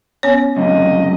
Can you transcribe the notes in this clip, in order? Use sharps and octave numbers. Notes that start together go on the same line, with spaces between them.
B3 C#4 C#5
C#2 F#2 C3 D#5